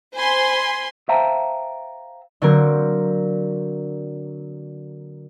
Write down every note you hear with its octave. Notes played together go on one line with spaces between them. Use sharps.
C5 G#5 B5 C6
C5 E5 F5 G5 A5 A#5
D3 F#3 A#3 C4 A#4